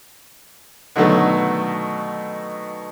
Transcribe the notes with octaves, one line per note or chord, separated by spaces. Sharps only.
B2 D3 D#3 F#3 A3 B3